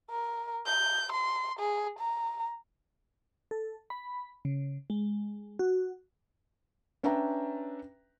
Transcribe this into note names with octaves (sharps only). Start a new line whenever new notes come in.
A#4
G6
C6
G#4
A#5
A4
B5
C#3
G#3
F#4
C#4 D4 B4 E5 G5 A#5